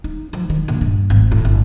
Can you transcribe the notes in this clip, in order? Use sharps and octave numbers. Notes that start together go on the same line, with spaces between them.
D#4
F3
D#3
A#1
G2
G#1
A2
G1